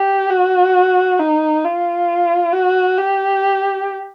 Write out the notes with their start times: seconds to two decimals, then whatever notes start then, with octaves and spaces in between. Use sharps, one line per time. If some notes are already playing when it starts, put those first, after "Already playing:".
Already playing: G4
0.30 F#4
1.19 D#4
1.64 F4
2.53 F#4
2.98 G4